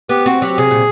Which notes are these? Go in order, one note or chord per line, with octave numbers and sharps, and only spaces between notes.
B3 G4
C4 F#4
F#3 G4
C3 G#4
A#2